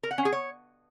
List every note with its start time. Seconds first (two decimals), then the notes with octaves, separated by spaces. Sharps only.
0.03 A#4
0.11 F#5
0.18 C#4
0.25 G#4
0.33 C#5